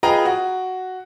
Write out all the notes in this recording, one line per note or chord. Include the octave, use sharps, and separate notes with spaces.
F4 G#4 B4 D#5 G5 A#5
F#4